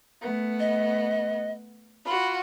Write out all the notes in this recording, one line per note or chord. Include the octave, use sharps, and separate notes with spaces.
A3 B3
D#5
F4 F#4 B5